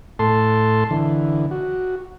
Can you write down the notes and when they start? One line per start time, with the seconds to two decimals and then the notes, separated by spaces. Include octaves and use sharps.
0.19 A2 A4 A5 C6
0.91 D3 E3
1.51 F#4